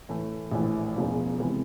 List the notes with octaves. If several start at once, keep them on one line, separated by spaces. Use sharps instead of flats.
A2 E3 A3
A#1 A2 E3
E1 E2 C#3 F3
C3 E3 G#3